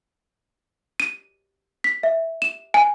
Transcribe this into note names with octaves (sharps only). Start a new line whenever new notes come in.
D#7
B6
E5
E7
G#5